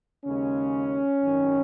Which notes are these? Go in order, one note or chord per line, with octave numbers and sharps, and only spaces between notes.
D#2 C#3 G#3 C#4
G#1 F#2 D#3